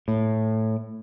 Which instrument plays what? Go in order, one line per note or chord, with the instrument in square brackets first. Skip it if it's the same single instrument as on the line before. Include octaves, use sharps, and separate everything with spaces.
[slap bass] A2